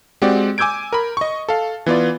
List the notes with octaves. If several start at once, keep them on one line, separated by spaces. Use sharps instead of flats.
G#3 C4 F#4 G4 D5
G#5 D6 E6 G6 G#6 D7
A#4 B5
D#5 C#6
A4 F5
E3 B3 F4 D5